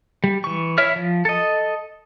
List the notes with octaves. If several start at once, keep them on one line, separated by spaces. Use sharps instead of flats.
G3
E3 C#6
E4 C#5 E5 F6
F3
A4 D#5